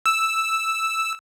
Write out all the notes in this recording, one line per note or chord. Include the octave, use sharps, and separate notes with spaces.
E6